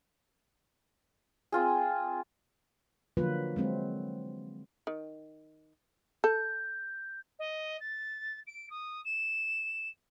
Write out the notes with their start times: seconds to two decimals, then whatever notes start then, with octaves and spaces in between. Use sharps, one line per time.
1.52 C4 F4 G#4
3.17 D3 F3 F#3 A#3 F4 B4
3.56 F#3 G#3 C4
4.87 D#3
6.24 A4 G6
7.39 D#5
7.80 A6
8.47 D7
8.70 D#6
9.05 E7